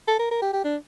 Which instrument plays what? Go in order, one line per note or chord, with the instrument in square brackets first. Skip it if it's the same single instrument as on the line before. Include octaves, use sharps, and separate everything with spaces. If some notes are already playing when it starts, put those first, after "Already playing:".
[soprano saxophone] A4
A#4
A#4
G4
G4
D4